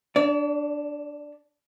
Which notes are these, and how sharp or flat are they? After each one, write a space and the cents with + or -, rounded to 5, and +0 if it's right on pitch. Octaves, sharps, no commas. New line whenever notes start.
D4 +0 D5 -40